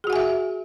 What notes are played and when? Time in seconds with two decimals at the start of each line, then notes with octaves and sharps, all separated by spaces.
0.04 G#4
0.07 F#4
0.10 F#5
0.13 G#5
0.16 E5